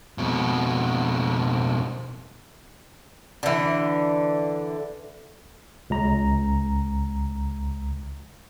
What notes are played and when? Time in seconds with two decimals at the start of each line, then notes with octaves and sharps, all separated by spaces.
0.18 F2 B2
3.43 D3 E3
5.90 C#2 A#5